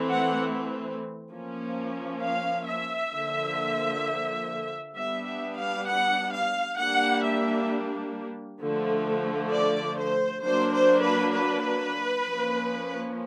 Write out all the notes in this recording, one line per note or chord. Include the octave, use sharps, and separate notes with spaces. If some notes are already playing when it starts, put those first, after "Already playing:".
Already playing: E3 A3 C4
F#5
F3 A#3 C#4
F5
E5
D3 F3 A#3
G3 B3 D4 E5
E5
F5
F#5
F5
G3 A#3 D4 F#5
E5
D3 F3 A3
D5
C5
F#3 A#3 D4 C5
C5
B4
B4
F3 A#3 C#4